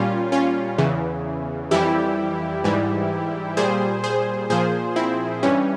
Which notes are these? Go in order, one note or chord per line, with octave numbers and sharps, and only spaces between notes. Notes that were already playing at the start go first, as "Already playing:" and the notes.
Already playing: A#2 G3 C#4 F4
C#4 F4
E2 C#3 E3
F2 E3 G3 E4 G4
G#2 E3 G3
A#2 G3 G#4 C5
G#4 C5
A#2 F3 G#4 C5
C4 E4
G2 E3 G3 C#4